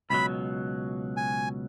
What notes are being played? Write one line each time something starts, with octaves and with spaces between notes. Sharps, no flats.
C#2 B2 F#3 B5
G#5